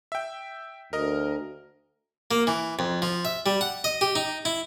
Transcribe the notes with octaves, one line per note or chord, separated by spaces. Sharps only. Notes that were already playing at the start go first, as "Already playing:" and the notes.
E5 G5
D2 A#4 D#5
A#3
E3
F2
F3
E5
G3
F#5
D#5
G4
D#4
E4